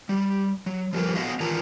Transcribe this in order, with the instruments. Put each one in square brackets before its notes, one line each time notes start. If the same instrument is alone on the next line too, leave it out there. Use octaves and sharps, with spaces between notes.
[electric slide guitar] G3
F#3
F3 G3 A#4 B4
B3 F#4 D#5 F5
D#3 E3 F4 A#4 A5 A#5